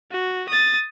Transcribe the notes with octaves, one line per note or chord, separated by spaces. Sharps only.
F#4
D#6 A6